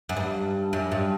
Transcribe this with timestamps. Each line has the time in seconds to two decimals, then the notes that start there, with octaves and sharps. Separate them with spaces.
0.09 F#2
0.17 G2
0.73 F#2
0.92 G2